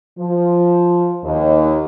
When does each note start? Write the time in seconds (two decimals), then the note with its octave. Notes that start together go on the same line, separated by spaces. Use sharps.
0.18 F3
1.24 D#2